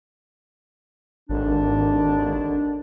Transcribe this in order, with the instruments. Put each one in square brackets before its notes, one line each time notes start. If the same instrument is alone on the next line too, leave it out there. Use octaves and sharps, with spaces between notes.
[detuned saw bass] G#1 [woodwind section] D#2 D3 D4